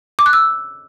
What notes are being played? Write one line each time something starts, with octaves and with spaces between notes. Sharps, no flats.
D6
F#6
E6